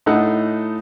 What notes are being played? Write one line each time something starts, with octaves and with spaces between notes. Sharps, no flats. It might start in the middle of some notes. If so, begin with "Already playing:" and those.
A2 D#4 A4 F#5